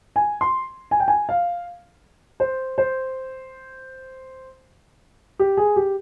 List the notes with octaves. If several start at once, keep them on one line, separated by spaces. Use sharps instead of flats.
G#5
C6
G#5
G5
G#5
F5
C5
C5
G4
G#4
G4